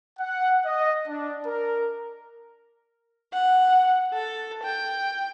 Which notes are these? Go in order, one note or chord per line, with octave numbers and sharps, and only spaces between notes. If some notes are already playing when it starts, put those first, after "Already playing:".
F#5
D#5
D4
A#4
F#5
A4
G5